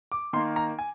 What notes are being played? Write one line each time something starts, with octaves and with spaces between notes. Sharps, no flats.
D6
D#3 A#3 C6
A#5
G#5